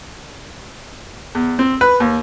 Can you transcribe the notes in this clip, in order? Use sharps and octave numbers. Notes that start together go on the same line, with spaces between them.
E2
C4
B4
D#2